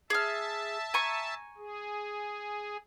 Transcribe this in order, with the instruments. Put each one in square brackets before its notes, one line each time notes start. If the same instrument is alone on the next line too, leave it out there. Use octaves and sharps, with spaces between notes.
[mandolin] G#4 F6 [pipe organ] E5 A5
[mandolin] G#5 A#5 C#6
[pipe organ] G#4